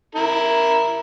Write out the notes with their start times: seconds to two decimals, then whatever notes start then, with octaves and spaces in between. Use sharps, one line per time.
0.15 E4 A#4